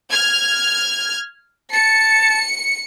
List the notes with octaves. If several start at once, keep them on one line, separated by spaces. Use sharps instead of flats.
F6 G#6
A5 C#7